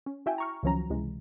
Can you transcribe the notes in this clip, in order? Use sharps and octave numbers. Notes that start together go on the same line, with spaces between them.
C#4
E4 F#4 E5 G5 G#5
A#5 C#6 F6
C#2 D#3 F3 F#3 C#4 A#5
C#2 C3 E3 G#3